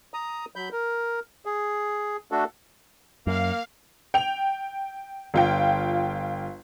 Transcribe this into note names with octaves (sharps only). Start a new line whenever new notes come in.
A#5 D#6
F#3 B5 G6
A#4
G#4
A3 D4 F#4 A4
F#2 A#3 F5
G5 F7
G1 F4 G5